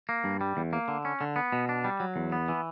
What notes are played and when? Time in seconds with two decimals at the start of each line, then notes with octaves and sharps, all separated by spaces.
0.09 A#3
0.24 G2
0.41 G3
0.57 E2
0.73 A#3
0.88 D3
1.05 C#4
1.21 D3
1.36 B3
1.52 B2
1.69 D4
1.84 G3
2.00 F#3
2.16 E2
2.32 B3
2.49 E3